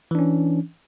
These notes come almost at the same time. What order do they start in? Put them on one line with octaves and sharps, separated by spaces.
E3 D4 C#4